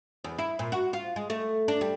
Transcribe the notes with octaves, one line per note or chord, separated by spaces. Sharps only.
E2
E4
A#2
F#4
F4
G#3
A3
D4
G3